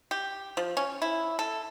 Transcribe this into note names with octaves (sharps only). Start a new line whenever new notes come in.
G4
F3
C#4
E4
A4